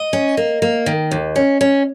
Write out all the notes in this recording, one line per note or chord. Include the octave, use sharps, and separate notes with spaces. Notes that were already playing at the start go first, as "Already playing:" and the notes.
Already playing: D#5
C#4
A#3
A#3
D#3
D#2
C#4
C#4